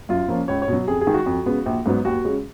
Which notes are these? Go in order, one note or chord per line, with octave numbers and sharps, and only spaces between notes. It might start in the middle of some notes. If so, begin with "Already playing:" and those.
F#2 F4
F3 A#3 C#4
C#2 C#5
C#5
B2
F#3
F2 G#4
G#4
D#3 G#3
F#4
F2
C#3 G#3 B3
A#1
G#2 F#3 B3
D#2 F#4
C#3 G#3 C#4